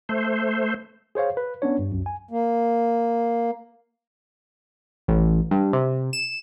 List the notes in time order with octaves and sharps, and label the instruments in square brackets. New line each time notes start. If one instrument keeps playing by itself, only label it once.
[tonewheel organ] A3 C5
[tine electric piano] G#4 C5 C#5 F5
B4
B3 C#4 D4 C#5
G2
C2 F#2
G#5
[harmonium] A#3
[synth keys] A1
G2
C3
E7